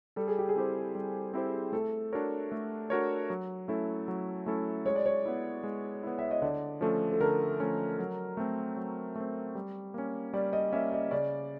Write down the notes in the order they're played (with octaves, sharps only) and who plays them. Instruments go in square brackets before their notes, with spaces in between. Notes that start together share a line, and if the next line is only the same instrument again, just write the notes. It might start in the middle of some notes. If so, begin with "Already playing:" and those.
[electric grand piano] G3 [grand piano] A4
[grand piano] G#4
G4
G#4
[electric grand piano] C4 E4 G4 C5
G3
C4 E4 G4 C5
[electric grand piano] A3 [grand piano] A4
[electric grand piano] D4 F#4 A#4 C#5
A3
D4 F#4 A#4 C#5
F#3
A3 C#4 E4 A4
F#3
A3 C#4 E4 A4
[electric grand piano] G#3 [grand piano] C#5
[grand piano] D5
C#5
[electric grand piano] B3 E4
G#3
B3 E4
[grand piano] E5
D#5
[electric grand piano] D3 [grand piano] D5
[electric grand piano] F3 A3 C#4 [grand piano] A4
[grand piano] A4
[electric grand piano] D3 [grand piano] A#4
[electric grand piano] F3 A3 C#4
F#3
A3 C4
F#3
A3 C4
G3
A#3 C#4
[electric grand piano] G3 [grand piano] D5
[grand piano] D#5
[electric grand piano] A#3 C#4 [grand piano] E5
[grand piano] D#5
[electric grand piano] C#3 [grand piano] D5